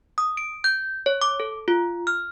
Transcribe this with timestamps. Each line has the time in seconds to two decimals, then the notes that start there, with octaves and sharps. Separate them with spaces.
0.18 D#6
0.37 D7
0.64 G6
1.06 C#5
1.22 D6
1.40 A4
1.68 F4
2.07 F6